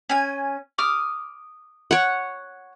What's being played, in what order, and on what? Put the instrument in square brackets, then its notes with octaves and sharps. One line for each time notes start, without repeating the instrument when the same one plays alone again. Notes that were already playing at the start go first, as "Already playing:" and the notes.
[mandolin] C#4 G#5
D6 D#6 F6
[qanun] C#5 F#5